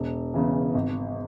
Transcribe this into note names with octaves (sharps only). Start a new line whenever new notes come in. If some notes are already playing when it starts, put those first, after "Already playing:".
Already playing: E1
E2 C#3 E3
G#1